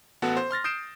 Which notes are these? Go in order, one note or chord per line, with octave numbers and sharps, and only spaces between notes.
A1 B3 F#4 A4 F#5
C5
C6 F6 A6 A#6
D#6 G6 C7 D7 E7